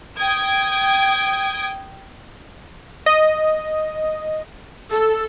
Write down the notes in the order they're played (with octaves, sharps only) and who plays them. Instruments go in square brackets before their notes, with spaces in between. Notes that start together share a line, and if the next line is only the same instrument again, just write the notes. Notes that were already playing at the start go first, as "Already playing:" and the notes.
[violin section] G5 D#6 G#6 D7
[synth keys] D#5
[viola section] A4